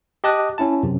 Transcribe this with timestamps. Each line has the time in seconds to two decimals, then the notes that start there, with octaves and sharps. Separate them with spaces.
0.24 G4 D#5 A5 D#6 F#6
0.58 C#4 E4 A5
0.83 F#2 C3